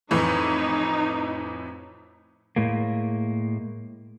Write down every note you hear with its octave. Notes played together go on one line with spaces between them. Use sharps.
F2 A2 E3 D#4
A2 G#3 A#3